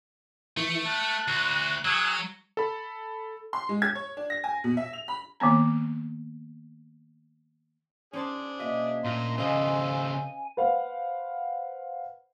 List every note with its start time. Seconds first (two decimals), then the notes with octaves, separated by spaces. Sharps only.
0.57 E3 A3
0.86 A5 F#6
1.28 D2 F#4
1.85 F#3 G#4 G#5 E6 F#6
2.57 A4 B5
3.53 C6
3.69 G#3
3.82 G#6
3.95 C#5
4.17 D4
4.30 A#6
4.44 G#5
4.64 B2
4.77 E5
4.93 F7
5.08 B5
5.40 D#3 A#3 B3 A#5
8.13 C#4 D4 G#4 C5 A5
8.60 B2 A#3 D#5 E5
9.04 A#2 A3 D4 A#5 C6
9.38 C#3 C4 A4 C5 D#5 F5 G#5
10.57 B4 C5 F5 F#5